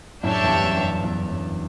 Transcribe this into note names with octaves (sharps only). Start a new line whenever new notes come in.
F#2 A2 D4 G4 C#5 E5 A5
E2 G2
F#2
G2
F#2
E2
F#2